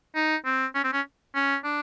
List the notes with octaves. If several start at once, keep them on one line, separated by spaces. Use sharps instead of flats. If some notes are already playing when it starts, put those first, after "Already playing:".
D#4
C4
C#4
C4
C#4
C#4
D4